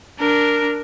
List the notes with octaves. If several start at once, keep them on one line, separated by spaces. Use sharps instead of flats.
D4 A#4